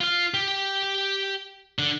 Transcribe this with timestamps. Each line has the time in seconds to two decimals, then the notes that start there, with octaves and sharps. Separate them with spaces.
0.01 F4 F5
0.34 G4
1.79 D3